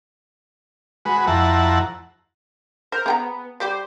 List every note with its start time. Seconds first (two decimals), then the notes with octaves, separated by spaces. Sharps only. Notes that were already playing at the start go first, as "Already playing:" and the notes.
1.05 G#3 F#4 B4
1.27 F2 E4 F#5 A5 A#5
2.92 A#4 C5
3.06 B3 G#4 G5 A#5
3.60 G3 G4 C5 D5